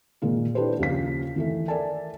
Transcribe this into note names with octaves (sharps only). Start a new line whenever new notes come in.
A#2 D#3 G#3 A#3
D4 E4 G4 A4 B4 C5
D#2 C#3 F3 F5 B6
D#3 E3 A3
A4 A#4 D5 E5 G#5 A5